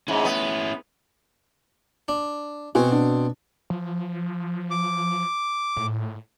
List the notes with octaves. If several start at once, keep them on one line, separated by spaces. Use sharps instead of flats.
G#2 C#4 E4
B3
D4
B2 C4 F#4 G#5
D4
F3
D6
A2